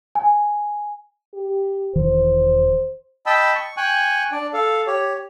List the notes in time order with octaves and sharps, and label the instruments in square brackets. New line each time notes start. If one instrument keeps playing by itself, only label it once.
[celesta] G#5
[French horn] G4
[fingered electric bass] E1 D#3 E3 [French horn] C5
[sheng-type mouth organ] D#5 G5 A5 B5 E6
C#6
G5 G#5 C#6 F#6
D4 D5
A4 F5
G4 C#5